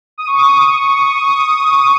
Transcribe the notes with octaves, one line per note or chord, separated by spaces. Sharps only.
D#6
C#6
D#6